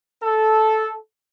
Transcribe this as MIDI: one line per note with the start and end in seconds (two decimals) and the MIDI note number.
0.23 0.96 69